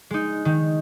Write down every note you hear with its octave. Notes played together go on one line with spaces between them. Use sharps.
G#3 D#4
D#3